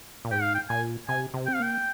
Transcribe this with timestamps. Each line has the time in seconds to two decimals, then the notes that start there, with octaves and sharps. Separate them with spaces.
0.25 A#2
0.31 G#2 G5
0.42 F5
0.55 G5
0.70 A#2 G#5
1.09 C3 G#5
1.34 C3
1.47 C4 G5
1.55 F5
1.60 A#3 G5